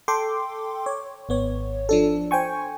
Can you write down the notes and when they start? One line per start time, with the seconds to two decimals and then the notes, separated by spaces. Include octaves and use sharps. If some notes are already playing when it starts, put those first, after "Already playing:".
0.08 A4 G5 C6 D6
0.86 C#5
1.29 G#1 B3 C#5
1.89 F3 D4 A4
2.31 C5 G5 G#5 C#6